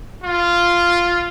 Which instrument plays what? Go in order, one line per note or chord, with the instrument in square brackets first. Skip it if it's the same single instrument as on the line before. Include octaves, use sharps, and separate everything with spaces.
[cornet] F4